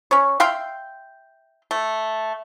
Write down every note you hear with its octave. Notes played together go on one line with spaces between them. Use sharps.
C#4 C#5
E5 F5 G5 C6
A3